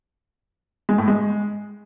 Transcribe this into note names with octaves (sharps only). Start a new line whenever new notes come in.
G#3
A2
G#3